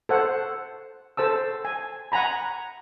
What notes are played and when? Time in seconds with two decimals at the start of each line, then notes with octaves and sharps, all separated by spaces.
0.09 A4 C5 F#5
1.17 A4 C5 A5 E6
1.65 G#5
2.12 F#5 G#5 A#5 B5